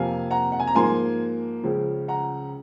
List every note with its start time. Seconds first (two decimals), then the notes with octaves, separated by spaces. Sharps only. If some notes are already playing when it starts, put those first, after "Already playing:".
Already playing: F2 C3 F3 A#3 F5 G#5
0.30 F#5 A#5
0.52 F#5
0.60 G#5
0.67 A#5
0.75 G#2 F3 A#3 G#5 C6
1.64 C#2 C#3 F3
2.08 F#5 A#5